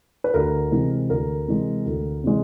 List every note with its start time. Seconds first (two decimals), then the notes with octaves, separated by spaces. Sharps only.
0.24 B4
0.34 D2 A#4
0.72 C3 E3 G#3
1.10 D2 A#4
1.48 C3 E3 G#3
1.86 D2
2.24 C3 E3 G#3